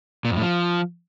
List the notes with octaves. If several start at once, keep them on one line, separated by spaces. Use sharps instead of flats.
A#2
F2
A2
F3